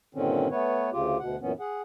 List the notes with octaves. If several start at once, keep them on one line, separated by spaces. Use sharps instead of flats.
G2 A#2 D3 D#3 C4 C#4
A3 B3 B4 C#5
D2 C#3 F4 G4
D2 B2 F#5
F#2 A#2 E3 B3 C#4
G#4 F#5